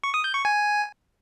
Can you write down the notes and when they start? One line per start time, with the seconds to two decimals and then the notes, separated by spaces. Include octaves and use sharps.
0.04 C#6
0.14 D#6
0.24 G6
0.35 C#6
0.45 G#5